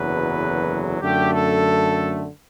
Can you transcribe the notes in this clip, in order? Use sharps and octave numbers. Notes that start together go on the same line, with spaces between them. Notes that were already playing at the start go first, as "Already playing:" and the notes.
Already playing: F#1 E2 D3 F#3 B4
F#2 D3 A3 G4
A4